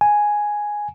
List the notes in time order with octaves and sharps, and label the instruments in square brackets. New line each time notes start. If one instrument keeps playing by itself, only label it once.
[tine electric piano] G#5